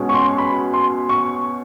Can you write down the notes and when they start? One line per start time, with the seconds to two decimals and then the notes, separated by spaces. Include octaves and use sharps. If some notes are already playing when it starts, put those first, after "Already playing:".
Already playing: B2 G#3 C#4
0.09 C#6
0.14 C6
0.38 B5
0.74 C6
1.09 C#6